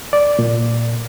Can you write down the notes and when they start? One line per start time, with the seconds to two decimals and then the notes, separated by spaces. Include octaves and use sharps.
0.13 D5
0.39 A#2